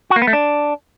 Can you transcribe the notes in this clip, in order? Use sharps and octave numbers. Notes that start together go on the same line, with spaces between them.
F#4
A#3
B3
A3
D4